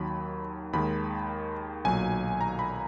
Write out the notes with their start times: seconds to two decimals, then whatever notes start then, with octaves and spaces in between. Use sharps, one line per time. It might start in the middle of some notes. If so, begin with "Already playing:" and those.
Already playing: D#2 D#3 F#3 B5
0.73 D#2 D#3 G#3 B5
1.85 B1 A#2 F#3 G#5
2.41 A#5
2.59 B5